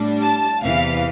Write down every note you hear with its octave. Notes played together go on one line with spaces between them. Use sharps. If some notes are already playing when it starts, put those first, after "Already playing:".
Already playing: A2 G3 D4
A5
E2 C3 E3 F5